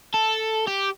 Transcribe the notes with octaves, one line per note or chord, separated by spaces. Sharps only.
A4
G4